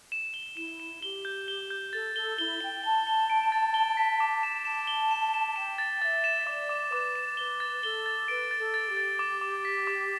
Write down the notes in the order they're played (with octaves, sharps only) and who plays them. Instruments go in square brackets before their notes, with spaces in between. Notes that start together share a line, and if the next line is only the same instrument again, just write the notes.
[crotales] E7
G7
[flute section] E4 [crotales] E7
[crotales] E7
[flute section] G4 [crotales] G7
[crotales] G6
G7
G6
[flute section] A4 [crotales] A6
[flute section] A4 [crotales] G7
[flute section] E4 [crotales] G7
[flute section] G5 [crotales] G7
[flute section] A5 [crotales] G7
[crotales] G7
D7
A6
G7
B6
D6
E7
[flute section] A5 [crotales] E7
[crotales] G7
E7
E7
[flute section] G5 [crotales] E7
[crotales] A6
[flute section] E5 [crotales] A6
[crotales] E7
[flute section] D5 [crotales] D6
[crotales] D6
[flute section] B4 [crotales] D6
[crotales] E7
[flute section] B4 [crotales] G7
[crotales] A6
[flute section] A4 [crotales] G7
[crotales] A6
[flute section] B4 [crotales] D7
[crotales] A6
[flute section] A4
[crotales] A6
[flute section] G4
[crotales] A6
D6
D6
B6
D6